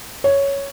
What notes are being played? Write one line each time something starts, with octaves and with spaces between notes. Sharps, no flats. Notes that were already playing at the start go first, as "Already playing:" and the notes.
C#5